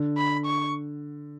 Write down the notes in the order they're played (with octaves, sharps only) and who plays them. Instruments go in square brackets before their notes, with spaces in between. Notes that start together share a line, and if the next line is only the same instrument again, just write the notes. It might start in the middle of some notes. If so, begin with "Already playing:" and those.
Already playing: [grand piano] D3
[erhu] B5
C#6